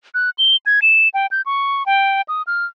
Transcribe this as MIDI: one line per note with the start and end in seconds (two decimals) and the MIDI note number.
0.14 0.30 90
0.38 0.56 103
0.66 0.80 92
0.82 1.09 100
1.14 1.27 79
1.31 1.42 91
1.46 1.86 85
1.86 2.22 79
2.28 2.42 87
2.47 2.65 89